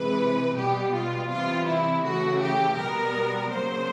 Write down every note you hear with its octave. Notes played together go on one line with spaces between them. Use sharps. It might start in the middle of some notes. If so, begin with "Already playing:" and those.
Already playing: C3 E3 G#3 B4
B2 G3 B3 G4
F4
C3 E3 G3 B3 F4
E4
C#3 E3 A3 F#4
G4
B2 G3 B3 A#4
C#3 F#3 A#3 C5